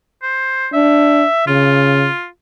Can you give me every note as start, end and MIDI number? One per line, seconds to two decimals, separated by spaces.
0.23 0.68 72
0.73 1.25 62
0.73 1.44 76
1.47 2.09 49
1.47 2.27 65